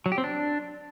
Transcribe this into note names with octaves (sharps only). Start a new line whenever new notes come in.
F#3
G4
C4
D4